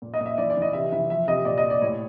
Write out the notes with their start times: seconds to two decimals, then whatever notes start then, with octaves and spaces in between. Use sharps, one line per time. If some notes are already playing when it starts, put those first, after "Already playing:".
0.02 A#2
0.14 D#5
0.20 A#2
0.26 E5
0.38 E3 D5
0.50 D5
0.56 E3
0.62 D#5
0.73 C3 E5
0.92 E3 E5
1.10 F3 E5
1.28 C3 D#5
1.45 A#2 D5
1.58 D#5
1.64 A#2
1.70 D5
1.82 A2 C#5